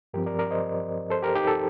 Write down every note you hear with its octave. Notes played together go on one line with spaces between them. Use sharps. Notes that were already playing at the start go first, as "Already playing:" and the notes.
G2 F3 C4 G4 A#4
A#4 D5
A#4 D5
C5 D#5
A4 C5
G4 A#4
D#4 G4
A4